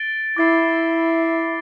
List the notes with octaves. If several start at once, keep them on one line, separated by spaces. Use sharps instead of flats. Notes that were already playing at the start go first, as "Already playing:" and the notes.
Already playing: A6 D7 G7
E4 D6 A6 C7